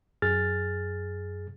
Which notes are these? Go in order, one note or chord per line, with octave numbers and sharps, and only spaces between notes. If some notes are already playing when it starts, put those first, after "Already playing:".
F#2 G#4 F6 A6